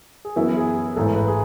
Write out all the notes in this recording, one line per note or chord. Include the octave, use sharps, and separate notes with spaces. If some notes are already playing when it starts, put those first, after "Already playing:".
G#4
F#2 E3 B3 E4 F#4
G#4
G#4
A1 G#2 E3 A4
B4
G#4